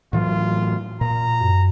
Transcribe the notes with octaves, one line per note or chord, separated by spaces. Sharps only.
A2 E3 F#3 F4
A#2 A#5
F#2